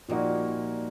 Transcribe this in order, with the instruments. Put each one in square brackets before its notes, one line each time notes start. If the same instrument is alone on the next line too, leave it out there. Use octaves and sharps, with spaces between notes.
[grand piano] A#2 F3 A#3 D#4 F#4 [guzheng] G3